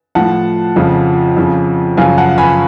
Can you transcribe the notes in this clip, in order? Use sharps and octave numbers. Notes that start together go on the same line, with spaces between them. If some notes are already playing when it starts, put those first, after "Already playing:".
A2 F3 F#5 A5
F2 C#3 F3
F2 C#3 F3
F#2 C#3 F3 F5 G#5
F#5 A5
G#5 B5